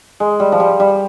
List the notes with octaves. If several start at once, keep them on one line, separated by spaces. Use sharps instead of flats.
G#3
G3
F3
G3
G3